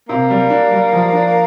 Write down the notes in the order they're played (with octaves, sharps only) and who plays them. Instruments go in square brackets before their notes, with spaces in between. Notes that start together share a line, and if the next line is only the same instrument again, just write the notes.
[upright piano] C3 [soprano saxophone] A#3
[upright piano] G3
D4
G3
F3
D4